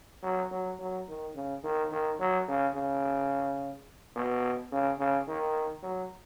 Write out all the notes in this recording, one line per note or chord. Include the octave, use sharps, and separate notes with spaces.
F#3
F#3
F#3
D#3
C#3
D#3
D#3
F#3
C#3
C#3
B2
C#3
C#3
D#3
F#3